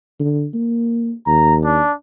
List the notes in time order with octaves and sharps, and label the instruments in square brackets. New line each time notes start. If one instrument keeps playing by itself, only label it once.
[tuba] D3
A#3
[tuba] D#2 [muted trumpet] A#5
[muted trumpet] D4